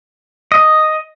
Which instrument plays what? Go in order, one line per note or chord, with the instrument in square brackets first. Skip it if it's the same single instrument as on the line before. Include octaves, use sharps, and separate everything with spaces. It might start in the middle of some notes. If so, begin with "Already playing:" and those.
[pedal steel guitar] D#5